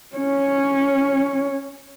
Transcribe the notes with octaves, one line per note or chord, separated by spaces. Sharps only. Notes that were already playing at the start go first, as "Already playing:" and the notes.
C#4 C#5